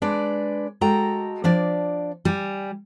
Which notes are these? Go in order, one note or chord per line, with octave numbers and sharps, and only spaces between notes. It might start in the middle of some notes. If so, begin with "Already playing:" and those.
G#3 D4 B4 D5
G#3 F#4 A4 G5 A#5
F3 D4 D5
G3 G#5